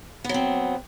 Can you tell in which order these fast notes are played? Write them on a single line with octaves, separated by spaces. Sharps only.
B3 F#3 C4